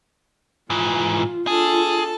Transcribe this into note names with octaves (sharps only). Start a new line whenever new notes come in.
G#2 E3 F4
D4 F4 G#4 A4 A5